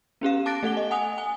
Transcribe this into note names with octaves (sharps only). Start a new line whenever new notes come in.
B3 C#4 G4 F5
A5 D6 F#6 A6 A#6 D7
A3 A4 F#5 G7
D#5
F#5 G#5 D#6 F7
G#5